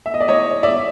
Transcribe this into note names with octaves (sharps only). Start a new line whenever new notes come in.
E5
D#5
D5
C#5 D#5
D5 E5